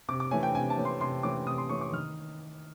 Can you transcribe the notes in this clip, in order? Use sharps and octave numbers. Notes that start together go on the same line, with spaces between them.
C3 D6
D6
E3 A3 C#4 G#5
G5
C3 G#5
A5
E3 A3 C#4
C6
C3 C6
E3 A3 C#4 D6
C3 D#6
C6
E3 A3 C#4 C#6
D6
D#3 F6